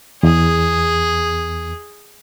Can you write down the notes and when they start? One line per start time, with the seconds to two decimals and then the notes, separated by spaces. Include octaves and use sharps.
0.23 E2 G#4